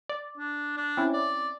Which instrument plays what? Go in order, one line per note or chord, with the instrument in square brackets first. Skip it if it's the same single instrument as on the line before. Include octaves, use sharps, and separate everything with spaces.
[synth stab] D5
[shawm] D4
D4
[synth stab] C4 C#4 E4
[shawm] D5